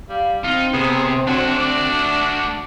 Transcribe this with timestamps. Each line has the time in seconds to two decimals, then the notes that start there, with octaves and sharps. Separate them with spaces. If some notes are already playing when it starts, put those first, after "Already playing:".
0.09 G3 F5
0.44 C4 D#4 F4
0.74 C3 B3 G#4
1.27 F#3 A3 D4 F#4
1.51 D5